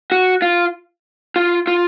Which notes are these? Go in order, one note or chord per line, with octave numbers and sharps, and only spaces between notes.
F#4
F4
F4
F4